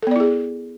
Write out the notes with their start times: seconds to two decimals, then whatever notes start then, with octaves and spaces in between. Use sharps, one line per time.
0.02 A4
0.07 B3
0.11 D5
0.16 E4
0.20 G#4